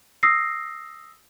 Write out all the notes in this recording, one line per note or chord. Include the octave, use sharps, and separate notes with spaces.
D#6 E6 A#6 C7